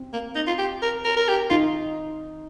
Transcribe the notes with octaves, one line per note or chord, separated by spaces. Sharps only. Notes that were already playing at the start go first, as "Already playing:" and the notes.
Already playing: C4
A#3
D#4
F4
G4
A#4
A#4
A#4
G4
D#4 F4